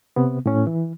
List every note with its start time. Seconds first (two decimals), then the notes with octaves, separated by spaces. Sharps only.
0.16 C3 B3
0.46 A2 C#4
0.67 E3